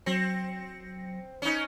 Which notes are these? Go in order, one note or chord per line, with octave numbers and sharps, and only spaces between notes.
F#3 C4 A#6 C#7
C#4 D#4